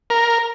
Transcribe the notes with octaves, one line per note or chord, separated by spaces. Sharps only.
A#4